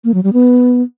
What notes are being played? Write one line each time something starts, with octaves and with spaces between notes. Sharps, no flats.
A#3
F#3
G3
B3